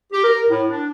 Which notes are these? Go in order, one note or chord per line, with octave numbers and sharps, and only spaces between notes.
G4
A#4
A2
D4